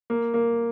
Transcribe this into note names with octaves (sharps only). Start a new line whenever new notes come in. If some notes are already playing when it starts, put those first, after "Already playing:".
A#3
A#3